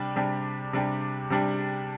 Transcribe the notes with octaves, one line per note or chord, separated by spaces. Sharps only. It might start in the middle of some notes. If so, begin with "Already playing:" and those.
Already playing: C3 G3 D4 G4
C3 G3 D4 G4
C3 G3 D4 G4
C3 G3 D4 G4